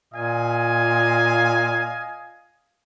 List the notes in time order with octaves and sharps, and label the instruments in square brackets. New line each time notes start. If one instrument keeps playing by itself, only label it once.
[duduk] A#2 [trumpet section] D#5 F5 G#5